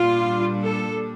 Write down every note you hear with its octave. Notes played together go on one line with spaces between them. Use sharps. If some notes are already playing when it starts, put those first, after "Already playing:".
Already playing: A#2 G3 D4 F4
A4